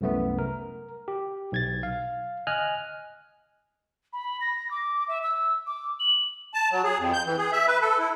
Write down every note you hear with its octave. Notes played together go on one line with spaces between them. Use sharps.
C2 F#2 A3 B3
A#4
G4
B1 G#6 A6
F5
D#5 G#5 F6 F#6
B5
A#6
D6
E5
E6
D6
F#7
A5
F#3
G#4
F2
G6
E3
G#4
E5
B4
A4
E4